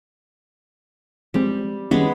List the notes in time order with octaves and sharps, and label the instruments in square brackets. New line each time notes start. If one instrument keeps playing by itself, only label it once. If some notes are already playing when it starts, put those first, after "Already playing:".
[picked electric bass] F3 G#3 C4 [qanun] G3
[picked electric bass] D#3 G3 C#4 [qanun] G#3 B3 G#4